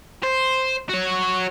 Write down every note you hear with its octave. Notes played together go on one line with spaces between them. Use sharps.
C5
F#4 C#5